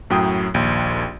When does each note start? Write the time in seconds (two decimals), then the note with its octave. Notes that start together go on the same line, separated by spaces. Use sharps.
0.10 F#2 A2 F#3 G5 D#6
0.54 A#1 D#2